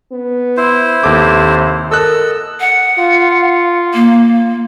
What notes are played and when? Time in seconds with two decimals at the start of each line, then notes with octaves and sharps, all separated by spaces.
0.12 B3
0.57 E4 C5
1.03 D#2 C3 A4 D6
1.91 A4 A#4 D#5 E6 F#6
2.60 F#5
2.99 F4
3.94 A#3